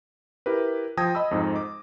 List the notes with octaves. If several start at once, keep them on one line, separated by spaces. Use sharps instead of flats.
E4 G4 A#4 B4
F3 G5 A5 D#6 G#6 A#6
D#5 B5 D#6 E6
F2 G#2 D#4
D6